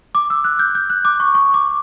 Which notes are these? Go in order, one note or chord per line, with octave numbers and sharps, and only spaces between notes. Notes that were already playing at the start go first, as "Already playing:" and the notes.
D6
E6
F#6
G6
G6
F#6
D6
C#6
C#6
D6